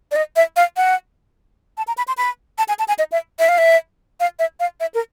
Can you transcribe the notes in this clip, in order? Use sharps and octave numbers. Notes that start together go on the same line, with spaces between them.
D5
D#5
E5
F5
F#5
A5
A#5
B5
C6
B5
A5
G#5
A5
G#5
D#5
E5
E5
F5
E5
F5
E5
F5
E5
A#4